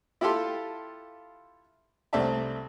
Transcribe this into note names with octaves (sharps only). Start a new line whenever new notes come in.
E4 F4 G4 A4 C6
C2 A3 C4 D5 E5 A5